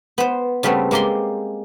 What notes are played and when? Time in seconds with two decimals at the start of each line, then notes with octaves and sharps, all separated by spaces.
0.18 B3 C5
0.63 C#3 G3 A3 B3 C4
0.91 G#3 A#3 G4 D5 C6